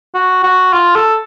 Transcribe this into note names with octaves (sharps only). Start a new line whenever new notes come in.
F#4
F#4
F4
A4